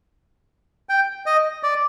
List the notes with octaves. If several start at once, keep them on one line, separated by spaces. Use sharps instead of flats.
G5
D#5
D5